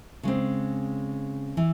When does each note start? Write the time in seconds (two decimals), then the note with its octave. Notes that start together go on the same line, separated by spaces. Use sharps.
0.23 C#3 G#3 C4
1.57 E3